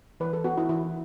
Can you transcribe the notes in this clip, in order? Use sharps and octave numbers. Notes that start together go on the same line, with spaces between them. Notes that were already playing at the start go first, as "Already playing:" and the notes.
E3 B4
A4
B3 F#4
E4
E3 E4